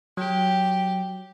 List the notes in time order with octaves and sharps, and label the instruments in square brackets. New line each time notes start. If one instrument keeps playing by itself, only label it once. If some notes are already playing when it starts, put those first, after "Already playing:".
[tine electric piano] F#3 [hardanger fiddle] G4